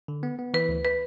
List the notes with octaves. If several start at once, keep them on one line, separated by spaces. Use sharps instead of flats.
D3
B3
B3
E3 B4
D2
B4